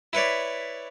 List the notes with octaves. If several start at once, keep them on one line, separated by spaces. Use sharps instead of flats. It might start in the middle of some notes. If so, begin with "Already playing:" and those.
E4 B4 C#5 D5